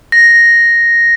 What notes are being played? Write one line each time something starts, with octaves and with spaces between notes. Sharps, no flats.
A#6